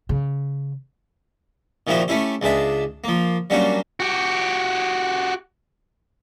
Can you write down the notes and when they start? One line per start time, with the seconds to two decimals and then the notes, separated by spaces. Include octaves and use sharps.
0.09 C#3
1.87 A#2 D#3 F3 E4 F#4 G4
2.08 A3 C#4 E4 G4
2.42 C#2 G#3 D4 E5
3.04 F3 A#3
3.50 F#3 G3 A#3 C#4 D4 F#4
4.00 F#4 G4